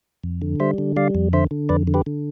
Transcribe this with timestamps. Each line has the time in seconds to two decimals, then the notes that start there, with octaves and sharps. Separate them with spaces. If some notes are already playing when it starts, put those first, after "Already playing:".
0.24 F2
0.42 D3
0.60 G3 C5 E5
0.78 D3
0.96 G3 D5 F5
1.15 F2
1.33 D3 C5 E5
1.51 D3
1.69 F2 B4 D5
1.87 D3
1.94 G4 B4
2.06 D3